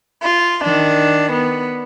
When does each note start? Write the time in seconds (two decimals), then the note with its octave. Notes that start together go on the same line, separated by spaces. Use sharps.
0.22 F4
0.64 D#3 D4
1.32 B3